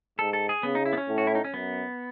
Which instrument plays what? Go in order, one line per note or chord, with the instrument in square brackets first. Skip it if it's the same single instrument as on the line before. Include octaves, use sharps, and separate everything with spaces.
[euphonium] G#2 [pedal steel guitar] A4
[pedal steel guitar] A4
G#4
[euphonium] C#3 [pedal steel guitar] B3
[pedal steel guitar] D#4
E4
B3
C#4
[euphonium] A2
[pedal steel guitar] F#4
E4
D#4
C#4
[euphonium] F#2 [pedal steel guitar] B3